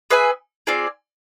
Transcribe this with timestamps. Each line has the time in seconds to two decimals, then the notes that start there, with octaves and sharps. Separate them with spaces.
0.10 G#4 B4 E5 G#5
0.67 C4 F4 G#4 D5